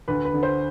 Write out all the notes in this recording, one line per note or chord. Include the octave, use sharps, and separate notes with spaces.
D2 B4
B4
D3
C5